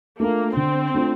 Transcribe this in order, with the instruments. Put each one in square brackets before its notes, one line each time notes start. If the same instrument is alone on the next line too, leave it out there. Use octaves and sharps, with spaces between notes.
[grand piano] A3 D4 F4 [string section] A#3
[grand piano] D3 [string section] C4
[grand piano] A3 D4 F4